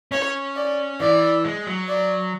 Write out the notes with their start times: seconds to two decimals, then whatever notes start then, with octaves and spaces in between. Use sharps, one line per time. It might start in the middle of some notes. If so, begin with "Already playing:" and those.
0.12 C#4 C#5
0.56 D5
1.00 E3 D5
1.45 G#3
1.67 F#3
1.88 D5